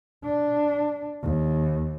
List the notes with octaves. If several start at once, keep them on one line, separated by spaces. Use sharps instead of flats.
D4
D#2